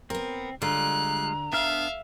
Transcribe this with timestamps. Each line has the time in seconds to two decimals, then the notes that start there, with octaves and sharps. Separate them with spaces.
0.10 B3 C4 A#4
0.62 D3 G3 G#3 F4 A#5 F#6
1.53 B3 D4 E5 F5 F6